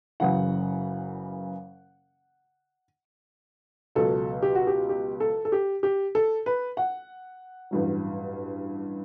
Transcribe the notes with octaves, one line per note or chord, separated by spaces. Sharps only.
F#1 F#2 C#3 E3 F#5
C#2 B2 F#3 A4
G4
F#4
G4
G4
A4
A4
G4
G4
A4
B4
F#5
A1 G2 F#3